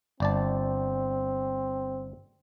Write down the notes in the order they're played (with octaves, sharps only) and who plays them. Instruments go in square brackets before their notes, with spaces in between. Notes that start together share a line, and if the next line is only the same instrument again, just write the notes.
[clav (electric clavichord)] G1 D5 A5 [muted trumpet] C4